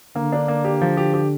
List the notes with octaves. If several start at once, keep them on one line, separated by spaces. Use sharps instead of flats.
D3 A#3
D4
A#3
G4
F3
G4
G4